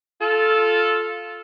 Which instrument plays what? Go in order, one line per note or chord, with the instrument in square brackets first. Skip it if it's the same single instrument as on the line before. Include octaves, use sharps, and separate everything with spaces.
[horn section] F4 A4